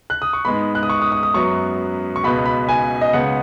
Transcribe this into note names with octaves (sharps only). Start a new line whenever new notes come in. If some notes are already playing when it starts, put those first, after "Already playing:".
F#6
D#6
C#6
G#2 G#3 B3 B5
F#6
D#6
C#6
D#6
D#6
D#6
F#2 F#3 B3 C#6
C#6
C#2 B2 B3 B5
B5
G#5
D#5
C#2 C#3 B3 F#5